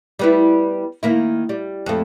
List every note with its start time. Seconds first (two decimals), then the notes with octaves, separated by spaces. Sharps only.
0.19 G3 B3 E4
1.03 D#3 A#3 E4
1.49 G3
1.86 F2 A3